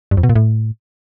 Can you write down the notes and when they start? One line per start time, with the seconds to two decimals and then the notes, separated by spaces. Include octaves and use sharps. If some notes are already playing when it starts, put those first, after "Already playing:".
0.11 G2
0.17 F2
0.23 B2
0.29 A#2
0.35 A2